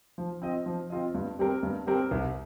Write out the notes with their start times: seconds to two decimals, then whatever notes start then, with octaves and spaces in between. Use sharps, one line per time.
0.18 F3
0.42 C4 F4 D#5
0.66 F3
0.90 C4 F4 D#5
1.14 G2
1.39 G3 C4 G4 A#4
1.63 G2
1.87 G3 C4 G4 A#4
2.11 C2